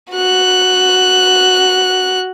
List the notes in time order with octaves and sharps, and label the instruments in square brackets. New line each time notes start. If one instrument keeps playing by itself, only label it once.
[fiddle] F#4 F#6